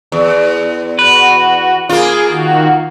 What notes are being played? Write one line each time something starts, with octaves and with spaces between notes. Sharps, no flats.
E2
F#4 B4
A#3 F4 G#4
D#3 F#4